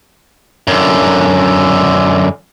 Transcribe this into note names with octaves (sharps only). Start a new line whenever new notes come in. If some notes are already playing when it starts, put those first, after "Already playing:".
F#2 D3